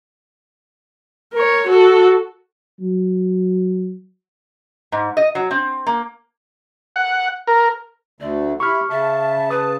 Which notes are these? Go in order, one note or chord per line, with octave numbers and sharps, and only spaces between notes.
A#4 C#5
F#4 A4
F#3
G#2
D#5
F#3
C4
A#3
F#5
A#4
D2 D3 A3 D5
E4 G4 B5 C#6 F6
C#3 E5 A5
B4 D#6